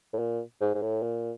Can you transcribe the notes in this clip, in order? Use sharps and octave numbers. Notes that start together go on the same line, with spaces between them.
A2
A#2
G#2
G#2
A2
A#2